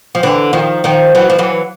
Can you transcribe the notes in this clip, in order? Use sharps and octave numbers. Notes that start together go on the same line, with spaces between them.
F3
D3 E3
D#3 F3
D#3 F3
E3 F#3
F3
E3 F#3